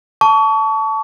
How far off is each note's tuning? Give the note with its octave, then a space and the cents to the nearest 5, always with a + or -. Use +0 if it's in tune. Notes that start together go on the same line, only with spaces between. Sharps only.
A5 +0 C#6 +35